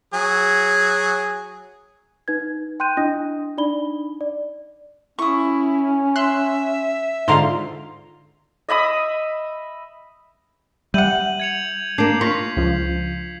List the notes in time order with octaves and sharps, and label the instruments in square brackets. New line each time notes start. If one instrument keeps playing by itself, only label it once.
[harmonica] F#3 G#4
[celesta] D#4 B4 G#6
G5 C6 F#6 G6 D#7
D4 E4 D#5 G5 D#6 A#6
D4 D#4 D5 B5 G7
D5
[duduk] C#4 [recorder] E4 [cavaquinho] C#6 D#6
[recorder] E5 [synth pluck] C6 F#6
[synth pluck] G#2 D3 F4 [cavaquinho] F5 A#5 C6
[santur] D#5 E5 B5 D#6
[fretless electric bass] G3 [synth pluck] E5 F#5 [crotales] G6 D#7 F#7
[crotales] G#6 C#7 F7
[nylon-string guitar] A#3 D4 [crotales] G6 C7
[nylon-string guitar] F4 [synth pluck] C6 C#6 A#6 [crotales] B6
[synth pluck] C#2 F3